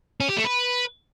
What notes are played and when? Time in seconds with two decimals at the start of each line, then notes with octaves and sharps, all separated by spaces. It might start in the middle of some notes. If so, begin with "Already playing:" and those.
0.20 C#4
0.29 G4
0.37 A3
0.45 B4